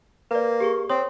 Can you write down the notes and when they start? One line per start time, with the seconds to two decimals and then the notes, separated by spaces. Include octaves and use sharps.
0.31 A#3 B4 D5
0.60 G4 G#4 C#6
0.89 C4 C#5 C6 D#6